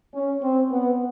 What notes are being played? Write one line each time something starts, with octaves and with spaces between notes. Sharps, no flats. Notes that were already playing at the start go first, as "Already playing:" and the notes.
C#4
C4
B3